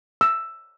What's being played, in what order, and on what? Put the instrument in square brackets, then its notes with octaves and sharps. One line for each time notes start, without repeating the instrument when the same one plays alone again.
[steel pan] E6